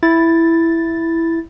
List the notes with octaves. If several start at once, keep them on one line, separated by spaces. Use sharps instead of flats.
E4 A6